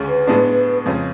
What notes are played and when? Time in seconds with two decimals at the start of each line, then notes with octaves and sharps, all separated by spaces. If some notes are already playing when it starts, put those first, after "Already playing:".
Already playing: D2 C#3 G#3 C#4
0.08 B4
0.27 A2 G#3 B3 D4
0.86 F2 C#3 G#3 C#4